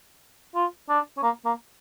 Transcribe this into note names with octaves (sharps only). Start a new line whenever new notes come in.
F4
D4
C#4
A#3
A#3